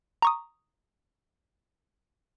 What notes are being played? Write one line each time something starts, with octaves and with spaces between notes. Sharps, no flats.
A#5 C#6 D#6